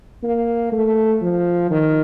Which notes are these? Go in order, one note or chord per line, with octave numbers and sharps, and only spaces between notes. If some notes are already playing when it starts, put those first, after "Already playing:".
A#3
A3
F3
D#3